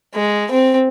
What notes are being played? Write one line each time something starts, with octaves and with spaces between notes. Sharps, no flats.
G#3
C4